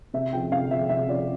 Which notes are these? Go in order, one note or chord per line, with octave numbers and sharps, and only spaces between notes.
C3 E5
F3 G5
C3 F5
F3 E5
C3 E5
F3 D5